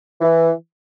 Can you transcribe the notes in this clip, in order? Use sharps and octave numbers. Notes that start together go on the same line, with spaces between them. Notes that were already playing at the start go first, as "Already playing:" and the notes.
E3